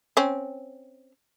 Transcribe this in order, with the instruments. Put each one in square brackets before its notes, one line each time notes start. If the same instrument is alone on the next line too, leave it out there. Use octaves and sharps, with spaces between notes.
[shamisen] C4 C#4